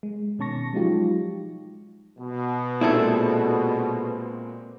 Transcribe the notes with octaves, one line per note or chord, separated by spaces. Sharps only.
G#3
B2 D#3 C#4 A5 C#6 A#6
F3 F#3 G#3 D#4 F4 G4
B2
A#2 G#3 C4 E4 G#4 A4